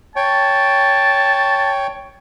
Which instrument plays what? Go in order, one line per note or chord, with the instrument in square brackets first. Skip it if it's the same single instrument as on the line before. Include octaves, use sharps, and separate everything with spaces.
[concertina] C#5 G5 [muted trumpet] A5